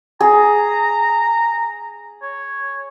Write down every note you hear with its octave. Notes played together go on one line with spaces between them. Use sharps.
G#4 A#5
C#5